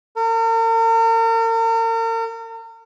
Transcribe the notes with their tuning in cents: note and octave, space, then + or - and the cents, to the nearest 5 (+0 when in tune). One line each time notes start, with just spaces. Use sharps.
A#4 -40